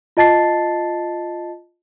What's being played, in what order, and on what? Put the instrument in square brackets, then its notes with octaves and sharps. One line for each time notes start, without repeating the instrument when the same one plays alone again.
[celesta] F4 D#5 A5 A6 C7